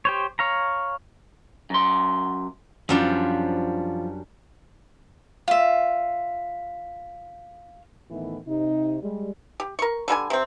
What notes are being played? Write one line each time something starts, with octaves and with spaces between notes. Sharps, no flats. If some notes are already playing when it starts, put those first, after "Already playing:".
G4 C5 C#5
C#5 F5 A#5
F#2 C6
F#2 F3 G3 D4 F4
F4 E5
A2 D#3 E3 B3 E4
C3 D#4
G3 G#3
G4
A#4 C#6
D3 G3 A#4 G#5
C3 C4